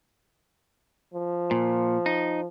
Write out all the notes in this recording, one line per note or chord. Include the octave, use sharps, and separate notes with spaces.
F3
A#2
D#4